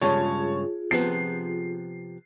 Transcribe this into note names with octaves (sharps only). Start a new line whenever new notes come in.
G2 C#3 G#3 F4 G#4 C#5 A5
C3 F3 B3 C7